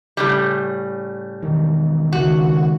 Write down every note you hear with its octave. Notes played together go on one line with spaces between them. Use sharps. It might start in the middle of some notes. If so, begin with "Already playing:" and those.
A2 C#3 G3
E1 D#3
C#2 D#3 F#4